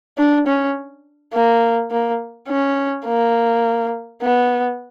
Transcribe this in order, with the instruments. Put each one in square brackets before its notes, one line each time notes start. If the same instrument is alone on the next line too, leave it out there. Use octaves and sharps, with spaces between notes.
[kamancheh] D4
C#4
A#3
A#3
C#4
A#3
B3